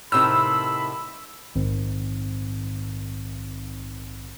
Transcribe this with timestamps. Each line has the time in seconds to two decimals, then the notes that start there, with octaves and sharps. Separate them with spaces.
0.12 A2 C3 D#3 B5 E6
1.55 A#1 G#2 D#3 C4